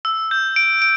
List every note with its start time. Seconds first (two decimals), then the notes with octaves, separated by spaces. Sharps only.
0.05 E6
0.31 G6
0.56 D7
0.82 D7